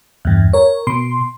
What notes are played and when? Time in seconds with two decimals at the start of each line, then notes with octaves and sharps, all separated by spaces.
0.25 E2 G2
0.53 A#4 C#5
0.87 B2 C6